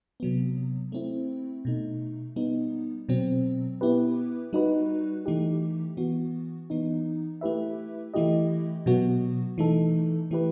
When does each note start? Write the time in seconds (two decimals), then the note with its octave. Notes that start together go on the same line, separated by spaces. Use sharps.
0.20 C3 F#3 B3
0.92 A3 C4 E4
1.65 B2 A3 D#4
2.36 G3 B3 D#4
3.09 B2 F#3 C4
3.81 B3 E4 G4 B4
4.53 G3 D#4 F#4 B4
5.26 E3 A3 D#4 G4
5.97 E3 B3 F#4
6.70 E3 B3 D#4
7.41 A3 E4 G4 B4 E5
8.14 E3 A3 E4 G4 D#5
8.86 B2 F#3 B3 F#4
9.58 E3 A3 D#4 A4
10.31 E3 A3 E4 G4 B4